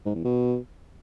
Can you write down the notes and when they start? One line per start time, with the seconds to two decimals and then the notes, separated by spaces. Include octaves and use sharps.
0.05 G#2
0.15 E2
0.25 B2